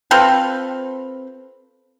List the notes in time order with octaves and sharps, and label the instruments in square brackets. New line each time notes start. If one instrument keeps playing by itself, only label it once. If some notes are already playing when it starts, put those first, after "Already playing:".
[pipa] C4 F4 A4 B4